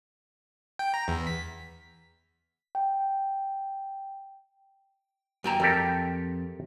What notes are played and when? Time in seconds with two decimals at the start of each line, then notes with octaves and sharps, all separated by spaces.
0.79 G5
0.94 A#5
1.08 E2
1.27 B6
2.75 G5
5.44 F#2 G5 A#5
5.60 F2 G4 A4 A#4